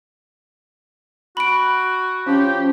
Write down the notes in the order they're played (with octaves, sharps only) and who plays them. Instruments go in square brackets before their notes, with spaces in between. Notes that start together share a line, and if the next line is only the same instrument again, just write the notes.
[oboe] F#4 [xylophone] B5 D7
[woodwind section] F3 G4 [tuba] C#4